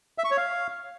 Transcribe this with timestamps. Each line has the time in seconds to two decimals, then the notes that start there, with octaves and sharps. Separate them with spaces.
0.18 E5
0.25 C#6
0.31 C#5
0.37 F5